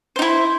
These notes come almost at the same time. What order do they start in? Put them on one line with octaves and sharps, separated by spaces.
C5 D#4 E4